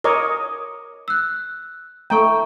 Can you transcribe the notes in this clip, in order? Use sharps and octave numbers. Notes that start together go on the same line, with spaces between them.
A#4 C#5 D#5 D6 D#6
E6 F#6
A3 G5 A#5 C#6